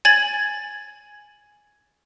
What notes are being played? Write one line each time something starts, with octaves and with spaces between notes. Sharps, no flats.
G#5 G#6 A6 F#7